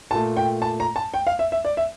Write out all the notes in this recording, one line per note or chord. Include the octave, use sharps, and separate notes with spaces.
A#2 A3 A5
G5
A5
A#5
A5
G5
F5
E5
E5
D5
E5